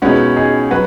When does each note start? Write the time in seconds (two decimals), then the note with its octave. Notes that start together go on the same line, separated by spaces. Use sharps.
0.02 C#2 B2 B3 C#4 D#4 F#4 G#4
0.36 D#4 G#4
0.71 F#3 F#4 B4